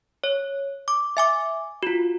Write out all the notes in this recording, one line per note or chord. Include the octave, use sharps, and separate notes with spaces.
C#5
D6
E5 G#5 D6
F4 F#4